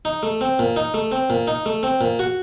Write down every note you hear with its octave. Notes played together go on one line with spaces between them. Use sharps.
D#4
A3
C4
A#2
D#4
A3
C4
A#2
D#4
A3
C4
A#2
F#4